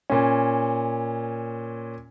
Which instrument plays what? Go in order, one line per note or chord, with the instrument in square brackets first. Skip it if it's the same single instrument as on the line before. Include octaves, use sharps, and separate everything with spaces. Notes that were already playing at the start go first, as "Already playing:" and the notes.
[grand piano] A#2 C#4